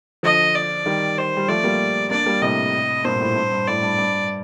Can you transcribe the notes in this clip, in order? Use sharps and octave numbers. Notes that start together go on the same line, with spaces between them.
D3 F3 D#5
D5
D#3 G3
C5
G3
F3 A3 D5
G3 A#3
A#3 D4 D5
G3 A#3
A2 C3 D#5
G2 A#2 C5
A2
G2
G2
A2 D5
G2
G2